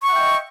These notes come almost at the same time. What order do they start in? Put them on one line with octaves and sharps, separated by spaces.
C#6 F#5 E5 G5 D#5